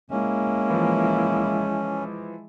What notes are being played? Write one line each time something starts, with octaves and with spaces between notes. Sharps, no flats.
G#3 A#3 C#4 E4
E3 F3